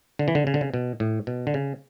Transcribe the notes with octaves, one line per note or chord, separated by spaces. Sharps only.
D3
E3
D3
C#3
D3
C#3
B2
A2
B2
D3
C#3